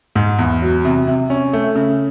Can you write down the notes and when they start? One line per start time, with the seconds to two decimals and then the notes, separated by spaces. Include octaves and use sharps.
0.16 G#2
0.39 E2
0.62 F#3
0.85 C3
1.07 C3
1.30 C#4
1.53 A3
1.76 C#3